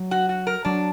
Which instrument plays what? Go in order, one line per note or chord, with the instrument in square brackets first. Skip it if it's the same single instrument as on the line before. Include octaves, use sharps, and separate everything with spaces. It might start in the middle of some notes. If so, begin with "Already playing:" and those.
Already playing: [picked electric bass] F#3
[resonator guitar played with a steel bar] F#4
F#4
A#4
[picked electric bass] F#3 [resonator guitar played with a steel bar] D4